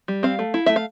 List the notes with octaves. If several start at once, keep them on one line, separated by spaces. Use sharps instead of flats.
G3
C4 F5
A3
E4
A3 E5
F5